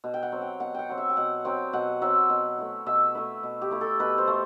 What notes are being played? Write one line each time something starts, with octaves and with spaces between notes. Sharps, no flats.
B2
G5
F#5
F#3 C4
G5
B2 F#5
F#5 G5
F#3 C4
E5
G5
B2 F#5
F#3 C4 G5
B2 F#5
F#3 C4 E5
B2
A3 E4
B2 E5
A3 E4 B4
B2
G4
A3 E4
A4
B2 B4
C5
A3